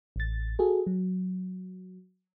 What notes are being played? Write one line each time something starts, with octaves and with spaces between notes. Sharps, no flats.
A1 A6
F#4 G#4 A4
F#3